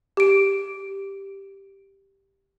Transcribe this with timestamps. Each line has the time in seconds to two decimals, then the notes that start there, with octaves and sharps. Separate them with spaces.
0.17 G4 D7